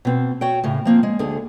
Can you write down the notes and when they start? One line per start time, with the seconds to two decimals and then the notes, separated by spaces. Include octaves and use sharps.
0.05 B2 C4
0.41 F#4 C#5 G5
0.64 A2 C#3
0.85 F3 A#3 C4
1.03 G#3
1.19 D2 D3 G#4